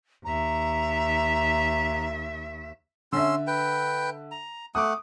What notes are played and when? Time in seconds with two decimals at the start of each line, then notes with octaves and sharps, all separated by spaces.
0.25 D#2 E5 A#5
3.12 D3 C#4 E5 C6 E6
3.47 B4 G5
4.32 A#5
4.75 A3 F#5 D6 D#6